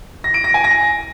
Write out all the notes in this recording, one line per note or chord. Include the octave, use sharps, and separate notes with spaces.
A#6
D7
A#6
G#5
A#6